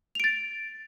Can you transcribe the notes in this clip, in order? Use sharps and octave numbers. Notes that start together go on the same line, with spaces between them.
A6 D7 F7